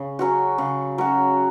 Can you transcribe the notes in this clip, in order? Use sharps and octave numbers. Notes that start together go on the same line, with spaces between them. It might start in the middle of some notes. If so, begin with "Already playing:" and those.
Already playing: C#3
F#3 C#4 F#4
C#3
F#3 C#4 F#4